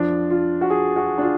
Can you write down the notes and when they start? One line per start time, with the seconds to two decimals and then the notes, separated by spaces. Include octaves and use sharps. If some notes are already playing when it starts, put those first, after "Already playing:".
Already playing: F2 F3 D4
0.30 F4
0.61 F#4
0.70 G#4
0.96 F#4
1.18 D4
1.22 F4